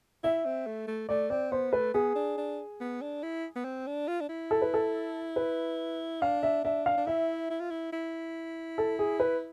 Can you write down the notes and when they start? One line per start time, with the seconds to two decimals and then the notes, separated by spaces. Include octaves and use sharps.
0.23 E4 E5
0.45 C4
0.66 A3
0.87 A3
1.09 A3 D5
1.30 C4 D5
1.52 B3 C5
1.73 A3 B4
1.94 B3 G#4
2.15 D4
2.37 D4
2.80 B3
3.01 D4
3.23 E4
3.56 B3
3.65 C4
3.87 D4
4.08 F4
4.21 D4
4.29 E4
4.51 A4
4.62 B4
4.74 A4
5.36 B4
6.21 D4 F5
6.43 E5
6.64 D4 E5
6.86 F5
6.97 D4
7.06 E4 E5
7.50 E4
7.60 F4
7.70 E4
7.92 E4
8.78 A4
8.99 G#4
9.20 B4